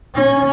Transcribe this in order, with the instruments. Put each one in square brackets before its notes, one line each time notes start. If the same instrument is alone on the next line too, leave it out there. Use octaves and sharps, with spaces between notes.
[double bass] C#4